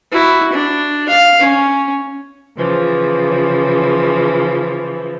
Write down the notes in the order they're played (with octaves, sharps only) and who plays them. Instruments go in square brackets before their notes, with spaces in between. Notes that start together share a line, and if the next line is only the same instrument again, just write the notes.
[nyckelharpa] E4 F#4
D4
F5
C#4
[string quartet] C#3 E3 F3